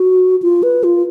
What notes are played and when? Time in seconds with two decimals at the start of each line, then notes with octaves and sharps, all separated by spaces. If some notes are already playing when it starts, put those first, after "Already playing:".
Already playing: F#4
0.42 F4
0.63 B4
0.84 F4